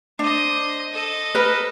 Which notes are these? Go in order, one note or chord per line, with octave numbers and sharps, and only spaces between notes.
D4 C5 D#5
A4 D#5
A#4 B4